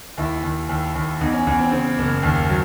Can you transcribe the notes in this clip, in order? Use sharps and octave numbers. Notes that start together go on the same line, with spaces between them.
D#2 E4
D#2
D#2
D#2
E2 D#4
C#4
E2 C#4
C4
C#3 C4
F#1
D#2
F#3